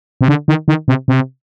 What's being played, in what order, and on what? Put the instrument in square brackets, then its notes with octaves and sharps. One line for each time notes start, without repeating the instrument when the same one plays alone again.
[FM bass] C3
D3
D#3
D#3
C3
C3